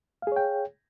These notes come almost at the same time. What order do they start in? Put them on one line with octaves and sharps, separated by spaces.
F5 G#4 C#5 G5